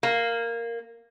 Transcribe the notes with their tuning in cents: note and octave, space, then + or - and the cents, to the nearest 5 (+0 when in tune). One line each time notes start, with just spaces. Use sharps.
A#3 -5